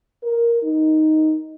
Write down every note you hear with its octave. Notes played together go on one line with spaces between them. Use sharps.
A#4
D#4